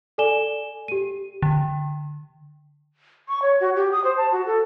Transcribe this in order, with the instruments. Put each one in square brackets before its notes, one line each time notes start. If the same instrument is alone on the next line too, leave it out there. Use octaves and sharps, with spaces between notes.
[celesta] A4 D5 G#5 E7 G7
G4 D#7
[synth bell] D3
[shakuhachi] C#6
C#5
F#4
G4
D#6
C5
A5
F#4
A4